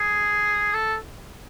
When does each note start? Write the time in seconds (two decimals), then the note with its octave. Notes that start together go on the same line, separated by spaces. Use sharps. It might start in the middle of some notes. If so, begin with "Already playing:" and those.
Already playing: G#4
0.74 A4